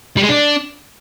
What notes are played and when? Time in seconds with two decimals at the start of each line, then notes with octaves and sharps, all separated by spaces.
0.17 G3
0.23 G#3
0.29 D4